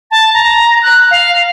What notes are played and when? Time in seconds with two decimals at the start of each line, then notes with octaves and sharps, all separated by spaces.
0.10 A5
0.33 A#5
0.82 F#6
1.10 F5